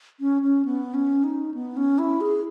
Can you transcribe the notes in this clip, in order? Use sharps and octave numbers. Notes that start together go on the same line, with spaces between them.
C#4
C#4
B3
C#4
D#4
B3
C#4
E4
G#4